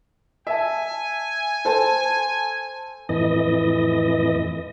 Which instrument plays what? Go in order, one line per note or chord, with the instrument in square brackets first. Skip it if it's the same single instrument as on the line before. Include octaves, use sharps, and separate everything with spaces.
[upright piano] E5 A5 [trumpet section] G#5
[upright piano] A4 C5 A5
[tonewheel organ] F2 A2 E3 D#5